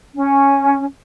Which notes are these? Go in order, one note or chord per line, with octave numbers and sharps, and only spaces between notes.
C#4